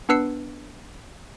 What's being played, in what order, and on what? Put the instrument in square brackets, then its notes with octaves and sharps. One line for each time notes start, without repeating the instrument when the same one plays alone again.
[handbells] B3 D4 B4 E6 C7 C#7